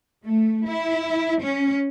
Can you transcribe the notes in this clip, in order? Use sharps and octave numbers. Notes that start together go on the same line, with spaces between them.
A3
E4
C#4